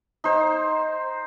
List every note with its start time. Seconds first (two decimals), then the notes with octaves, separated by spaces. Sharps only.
0.24 D#4 C5